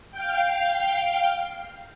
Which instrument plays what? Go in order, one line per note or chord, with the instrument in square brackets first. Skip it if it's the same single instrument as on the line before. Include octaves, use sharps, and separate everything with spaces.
[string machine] F5 G5